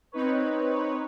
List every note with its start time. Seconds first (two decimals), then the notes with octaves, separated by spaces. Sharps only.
0.12 C4 D#4 B4 C#5